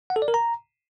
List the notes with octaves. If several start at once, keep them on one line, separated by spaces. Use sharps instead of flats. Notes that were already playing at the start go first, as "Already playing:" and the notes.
F#5
A4
D5
A#4
A#5